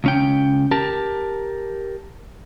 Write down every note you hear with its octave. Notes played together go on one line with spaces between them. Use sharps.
C#2 C#4 G5
G4 A#4 A5